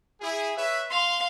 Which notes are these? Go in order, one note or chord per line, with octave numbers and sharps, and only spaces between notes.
E4 G#4
B4 C#5 E5
F5 C6